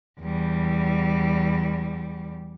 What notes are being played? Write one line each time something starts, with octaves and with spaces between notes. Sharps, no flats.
E2 G3